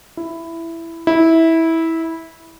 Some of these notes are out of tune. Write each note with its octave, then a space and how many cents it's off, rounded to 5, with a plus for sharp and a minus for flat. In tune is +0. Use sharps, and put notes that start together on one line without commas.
E4 +10
E4 -15